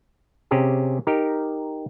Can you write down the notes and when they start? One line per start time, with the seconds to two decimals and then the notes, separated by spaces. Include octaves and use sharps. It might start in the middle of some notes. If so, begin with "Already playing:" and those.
0.51 C3 C#4 G4 G#4 A#5
1.07 D#4 G4 A#4